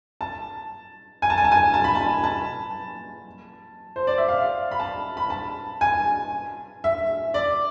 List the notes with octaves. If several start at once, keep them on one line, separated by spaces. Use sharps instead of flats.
A5
G#5
A5
G#5
A5
G#5
A5
B5
A5
A5
C5
D5
E5
F5
B5
A5
B5
A5
G#5
E5
D5